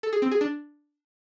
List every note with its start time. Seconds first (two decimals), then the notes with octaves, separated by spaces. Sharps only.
0.03 A4
0.13 G#4
0.22 C4
0.31 G#4
0.41 D4